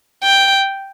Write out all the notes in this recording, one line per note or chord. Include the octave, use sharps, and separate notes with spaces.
G5